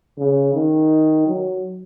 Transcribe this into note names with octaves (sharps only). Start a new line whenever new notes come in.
C#3
D#3
F#3